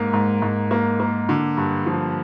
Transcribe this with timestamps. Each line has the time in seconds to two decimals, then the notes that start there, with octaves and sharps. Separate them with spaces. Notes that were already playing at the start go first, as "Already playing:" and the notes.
Already playing: G#2 A#3
0.13 G#2
0.42 G#2
0.71 A#3
1.00 A#3
1.29 D3
1.57 G2
1.86 F3